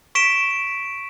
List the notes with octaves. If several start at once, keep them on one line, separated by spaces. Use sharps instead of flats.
C#6 B6 D7 E7